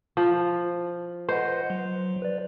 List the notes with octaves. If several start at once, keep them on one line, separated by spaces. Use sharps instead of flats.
F3
B4 C5 D#5 F#5
F#3
B4 D5